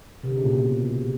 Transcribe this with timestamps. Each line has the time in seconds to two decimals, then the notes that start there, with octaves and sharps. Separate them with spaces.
0.23 C3
0.30 D3
0.37 C#3
0.44 A#2
0.51 B2